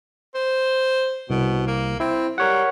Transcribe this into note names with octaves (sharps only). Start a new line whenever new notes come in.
C5
C2 B2
A#3
C4 E4
G3 A#4 C#5 F#5